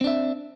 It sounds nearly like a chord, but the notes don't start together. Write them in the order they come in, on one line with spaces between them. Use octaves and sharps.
C4 D4 E5